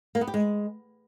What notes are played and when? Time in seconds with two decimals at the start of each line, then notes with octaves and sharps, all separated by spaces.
0.15 A#3
0.21 B3
0.27 G4
0.34 G#3